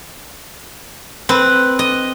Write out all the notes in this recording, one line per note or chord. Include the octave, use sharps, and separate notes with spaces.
C4 B4
D#5